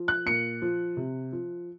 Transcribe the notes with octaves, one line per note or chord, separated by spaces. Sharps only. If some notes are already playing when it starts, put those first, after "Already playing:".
Already playing: F3
F#6
A#2 C#7
F3
C3
F3